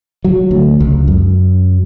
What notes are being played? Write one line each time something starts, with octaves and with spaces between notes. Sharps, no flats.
F#3
D2
C#2
F#2